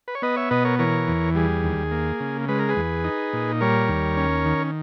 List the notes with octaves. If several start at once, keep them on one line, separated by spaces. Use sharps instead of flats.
B4
C#5
B3 B4 D#5
C#5 E5
B2 B4 D#5
A#4 C#5
E3 A#4 C#5
E2
G3 G#4
D#2
A#3
C#3
G#3 B4
A#4
G#4 B4
E2
D#4
A#2
G3 A#4 C#5
D#2
C#4
D#3